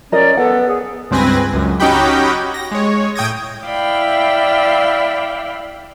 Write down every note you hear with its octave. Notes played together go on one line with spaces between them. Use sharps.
C#4 A#4 D5 D#5
B3 A4 F#5
G#4
C#2 G2 C4 B4 G#5 A#6
C#2 F#2
C#4 D#4 F#4 G4 G5 B5
A#6
G#3 C#5
A2 G5 D#6 G#6 A#6
E4 D5 E5 F5 G5 B5